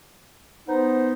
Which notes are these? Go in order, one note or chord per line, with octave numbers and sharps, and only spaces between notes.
B3 D#4 C5